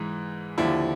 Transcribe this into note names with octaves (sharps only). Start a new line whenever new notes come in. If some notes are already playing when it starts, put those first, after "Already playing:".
Already playing: G#2 E3
D#2 D3 F3 E4